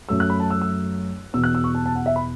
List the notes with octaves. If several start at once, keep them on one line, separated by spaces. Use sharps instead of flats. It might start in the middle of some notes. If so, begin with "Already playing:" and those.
F#2 F#3 A3 E6
F#6
B5
A5
E6
E6
E2 B2 B3 E6
F#6
E6
C#6
A5
A5
F#5
E5
B5